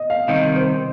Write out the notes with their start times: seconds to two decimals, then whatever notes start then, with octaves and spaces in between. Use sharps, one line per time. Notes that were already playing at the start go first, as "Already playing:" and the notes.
Already playing: D#5
0.10 F5
0.28 C2 C3 D#3 D#5
0.56 C5